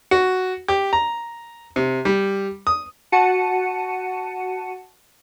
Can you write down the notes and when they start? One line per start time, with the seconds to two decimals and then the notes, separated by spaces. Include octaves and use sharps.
0.11 F#4
0.68 G4
0.93 A#5
1.76 C3
2.05 G3
2.67 D#6
3.12 F#4 F#5 A5 C#7 D#7